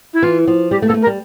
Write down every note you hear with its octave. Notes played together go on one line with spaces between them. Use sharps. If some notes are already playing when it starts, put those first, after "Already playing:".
E4
E3 F4
F3
G3 G4
A3
A4
A#3
A3
A#4
G3